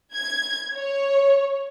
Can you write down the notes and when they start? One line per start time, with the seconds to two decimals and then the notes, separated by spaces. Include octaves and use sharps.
0.15 G#6
0.77 C#5